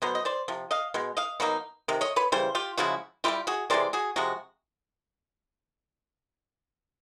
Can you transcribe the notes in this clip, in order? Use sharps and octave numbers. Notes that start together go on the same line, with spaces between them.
B2 F#3 B3 C5
D#5
C5 D5
C3 F3
D#5 F5
B2 G#3
D#5 F5
B2 F#3 A#3 D#4
C3 D#3
C#5 D#5
B4 C#5
C#3 E3 G3 C5
F4 G4
C#3 F3 G#3 E4 F#4
G3 C4 E4 F4 G4
F#4 G#4
C3 E3 G#3 C5 D5
F#4 G#4
C3 F3 G#3 F#4